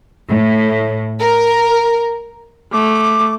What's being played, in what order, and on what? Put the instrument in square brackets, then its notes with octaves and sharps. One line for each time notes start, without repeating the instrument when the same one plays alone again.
[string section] A2
A#4
[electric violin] A3 [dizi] D6